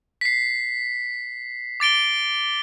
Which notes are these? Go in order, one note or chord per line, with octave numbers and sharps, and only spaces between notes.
B6 C7
D6 A6 D7 G7